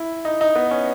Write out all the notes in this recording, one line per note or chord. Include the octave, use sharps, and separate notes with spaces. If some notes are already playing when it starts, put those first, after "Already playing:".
Already playing: E4
D#4
D#4
B3
C#4